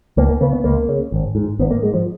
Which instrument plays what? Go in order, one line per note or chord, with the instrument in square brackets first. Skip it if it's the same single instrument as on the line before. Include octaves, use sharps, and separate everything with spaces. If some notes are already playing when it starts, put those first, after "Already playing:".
[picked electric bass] C#2 A#3
A#3
C#3 B3
B3
C#2 A#3
C#3
G#1
G#2
G#1 B3
A#3
G#2 G#3
F3